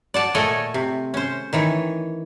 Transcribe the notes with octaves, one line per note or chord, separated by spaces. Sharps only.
D5 F#5 A5
A#2 A3 A4 C#5 D#5 G#5
C3
C#4 C5
D#3 E3 C#5